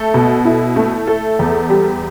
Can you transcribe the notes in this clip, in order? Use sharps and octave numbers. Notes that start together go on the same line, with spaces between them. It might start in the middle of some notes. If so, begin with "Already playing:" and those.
Already playing: A3 A4
B2
E4
A3
A4
E2
G3